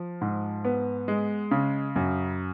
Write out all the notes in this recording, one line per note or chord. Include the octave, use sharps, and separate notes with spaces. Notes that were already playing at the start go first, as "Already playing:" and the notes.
Already playing: F3
G#2
B3
G#3
C#3
F#2